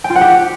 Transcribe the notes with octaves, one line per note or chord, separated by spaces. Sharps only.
G5
F4
F#5
G4